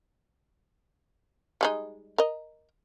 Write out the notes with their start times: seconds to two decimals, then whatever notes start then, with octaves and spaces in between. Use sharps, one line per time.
1.61 G3 G#3 D#4
2.18 A#4 D#5